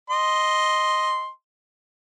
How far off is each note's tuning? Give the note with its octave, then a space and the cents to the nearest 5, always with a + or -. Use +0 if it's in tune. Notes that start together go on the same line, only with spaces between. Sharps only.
D#5 +0 C6 +0